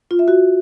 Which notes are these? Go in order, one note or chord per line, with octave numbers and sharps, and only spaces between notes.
F4
E5
F#4